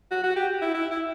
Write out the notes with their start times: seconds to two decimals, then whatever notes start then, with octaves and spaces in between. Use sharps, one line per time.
0.11 F#4
0.24 F#4
0.36 G4
0.62 E4
0.74 E4
0.92 E4